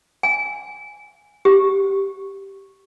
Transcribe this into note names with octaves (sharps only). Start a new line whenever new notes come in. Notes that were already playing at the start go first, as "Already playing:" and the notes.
G#5
G4